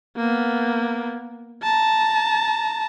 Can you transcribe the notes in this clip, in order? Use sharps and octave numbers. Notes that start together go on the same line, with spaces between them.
A#3 B3
A5 A#5